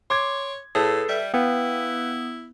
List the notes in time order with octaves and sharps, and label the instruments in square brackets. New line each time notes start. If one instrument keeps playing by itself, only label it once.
[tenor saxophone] C#5 [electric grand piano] C6 D6 G#6
[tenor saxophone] A2 [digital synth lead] G#4 [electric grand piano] A4 B4 A5
[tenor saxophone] G3 [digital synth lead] E5
[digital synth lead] B3 [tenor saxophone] E4 [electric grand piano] B4 F5 G5